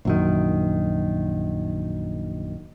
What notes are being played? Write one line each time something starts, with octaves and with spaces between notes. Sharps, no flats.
A#1 F#2 D#3